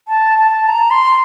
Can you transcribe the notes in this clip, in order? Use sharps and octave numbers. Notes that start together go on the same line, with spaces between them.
A5
A5
A#5
C6